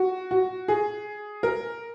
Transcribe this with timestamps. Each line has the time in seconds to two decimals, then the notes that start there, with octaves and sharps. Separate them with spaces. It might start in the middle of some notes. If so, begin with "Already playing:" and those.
Already playing: F#4
0.31 F#4
0.68 G#4
1.43 A#4